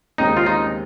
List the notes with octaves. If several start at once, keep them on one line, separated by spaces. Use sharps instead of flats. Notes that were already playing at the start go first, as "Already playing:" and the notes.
D#2 C#3 G#3 C4 D#4
F4
D#4